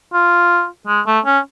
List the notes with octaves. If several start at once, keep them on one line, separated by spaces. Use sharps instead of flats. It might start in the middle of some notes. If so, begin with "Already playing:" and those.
F4
G#3
A3
C#4